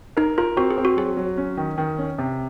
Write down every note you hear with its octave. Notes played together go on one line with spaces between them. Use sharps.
D#4 A#4
F4 A#4
C4 F#4
G#4
C4
F#4
F#3 G#4
F#3
C#4
D#3
D#3
C#4
C3